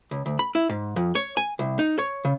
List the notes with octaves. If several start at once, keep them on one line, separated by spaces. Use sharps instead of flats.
C#2
D2
B5
E4
G#2
F2
C#5
G#5
C2
D#4
C#5
C#3